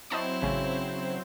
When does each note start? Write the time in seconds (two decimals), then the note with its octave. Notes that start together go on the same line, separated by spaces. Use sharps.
0.10 F#3 C4 E4 C5 D#5 A5 C#6
0.42 A1 C#3 C#4